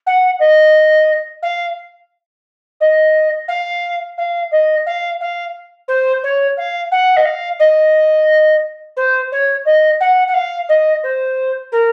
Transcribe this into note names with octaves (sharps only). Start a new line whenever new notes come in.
F#5
D#5
F5
D#5
F5
F5
D#5
F5
F5
C5
C#5
F5
F#5
D#5
F5
D#5
C5
C#5
D#5
F#5
F#5
F5
D#5
C5
A#4